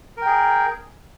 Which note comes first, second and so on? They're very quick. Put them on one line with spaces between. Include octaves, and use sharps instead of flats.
A#4 G5 G#4